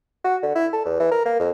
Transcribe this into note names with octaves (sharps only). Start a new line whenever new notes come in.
F#4
D3
E4
A4
E2
E3
A#4
A#3
F2